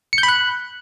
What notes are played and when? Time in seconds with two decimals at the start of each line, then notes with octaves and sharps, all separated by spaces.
0.13 C#7
0.18 G6
0.23 B5
0.28 F#6